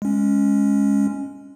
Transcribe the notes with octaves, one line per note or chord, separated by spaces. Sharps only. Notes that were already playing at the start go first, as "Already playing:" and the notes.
G#3 C#4